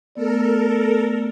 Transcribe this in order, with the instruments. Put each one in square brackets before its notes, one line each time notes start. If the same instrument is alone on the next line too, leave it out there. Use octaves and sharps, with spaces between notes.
[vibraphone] A3 B3 D5 [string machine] A4 A#4